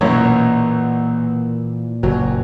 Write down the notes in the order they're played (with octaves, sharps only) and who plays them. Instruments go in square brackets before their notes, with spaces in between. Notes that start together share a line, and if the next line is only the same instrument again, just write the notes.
[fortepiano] B1 F#2 C#5 [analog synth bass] A#2 [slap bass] E3
[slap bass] F#1 [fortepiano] F#3